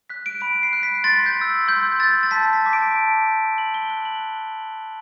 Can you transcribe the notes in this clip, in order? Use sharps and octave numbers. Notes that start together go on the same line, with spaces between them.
F#6 B6
D7
B5 D7
C7
F#6
B6
C6 A6
G6
E6 G6
C6 G6
E6 G6 A6
A6
A5 B6
B6
D6 G6
D7
A5
D6 G6
B5 F#7
G7
F#6 G7
F#7